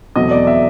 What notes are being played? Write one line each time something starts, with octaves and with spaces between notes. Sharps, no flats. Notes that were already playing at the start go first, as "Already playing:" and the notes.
E2 B2 F#3 A3 C4 D#5
D5
E5